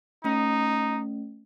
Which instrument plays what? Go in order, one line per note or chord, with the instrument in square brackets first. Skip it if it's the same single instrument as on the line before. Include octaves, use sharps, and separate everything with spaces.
[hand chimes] A3 C#4 [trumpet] D#4